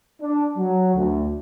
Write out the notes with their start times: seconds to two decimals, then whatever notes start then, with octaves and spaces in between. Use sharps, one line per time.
0.21 D4
0.57 F#3
0.95 D2